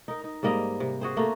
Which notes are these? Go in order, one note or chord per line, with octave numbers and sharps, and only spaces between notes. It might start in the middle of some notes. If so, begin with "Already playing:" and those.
D#4 A#4
D#4
G#2 G3 A#3 D#5
C3
F#4 G#4 C5
A3 A#3